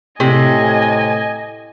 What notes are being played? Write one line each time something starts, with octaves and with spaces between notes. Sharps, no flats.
A2 C3 D#5 G#5